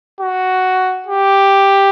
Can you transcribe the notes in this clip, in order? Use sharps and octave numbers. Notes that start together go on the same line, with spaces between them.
F#4
G4